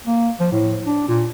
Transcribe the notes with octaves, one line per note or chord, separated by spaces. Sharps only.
A#3
F3
A2
D4
A#2